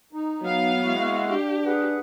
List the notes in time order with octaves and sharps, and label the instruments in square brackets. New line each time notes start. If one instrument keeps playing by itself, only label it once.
[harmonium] D#4
[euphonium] F#3 [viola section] B3 F5
[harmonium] G#3 E4 F#4
[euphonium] D4 [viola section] G4
[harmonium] G#4 B4 F#5